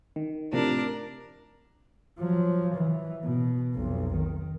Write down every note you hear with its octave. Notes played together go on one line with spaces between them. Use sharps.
D#3
A2 C3 F3 D4 A#4
F3 F#3
E3
B2
F1 B1
D#3